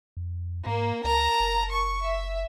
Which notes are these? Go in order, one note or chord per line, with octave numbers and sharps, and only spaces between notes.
F2
G#2 A#3
C#2 A#4 A5 A#5
F#1
C#6
E5